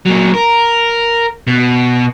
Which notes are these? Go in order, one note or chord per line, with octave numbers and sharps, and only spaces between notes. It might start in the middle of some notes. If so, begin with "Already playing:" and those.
A#2 F#3
A#4
B2